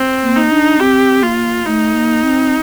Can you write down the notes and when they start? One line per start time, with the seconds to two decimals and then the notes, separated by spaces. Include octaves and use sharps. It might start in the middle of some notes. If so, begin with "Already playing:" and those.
Already playing: C4
0.22 A#3
0.36 D#4
0.51 D4
0.79 C4 G4
1.22 A#3 F4
1.66 A3 D#4
1.94 A#3
2.23 C4